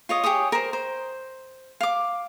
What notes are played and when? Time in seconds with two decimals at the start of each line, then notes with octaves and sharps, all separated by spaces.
0.09 F4 C#5 D#5
0.24 G4 G#4 C#5 D#6
0.52 A#4 C5
0.73 C5
1.81 F5 D6